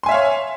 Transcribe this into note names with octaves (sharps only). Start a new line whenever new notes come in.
C#5 E5 F5 G#5 C6